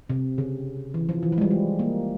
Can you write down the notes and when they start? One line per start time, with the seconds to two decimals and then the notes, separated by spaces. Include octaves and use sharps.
0.10 C3
0.38 C#3
0.94 E3
1.09 F3
1.23 E3
1.32 F3
1.38 G#3
1.41 G3
1.51 G#3
1.79 A#3